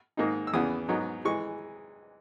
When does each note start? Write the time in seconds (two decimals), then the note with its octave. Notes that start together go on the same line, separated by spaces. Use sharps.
0.17 G#2 D#3 A#3 D#4
0.47 E6
0.53 E2 C#3 E3 B3 D#6
0.89 G#2 F#3 B3 D#4
1.25 E3 G#3 C#6